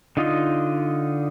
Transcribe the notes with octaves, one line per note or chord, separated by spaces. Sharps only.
D3 D#4 F4 D#5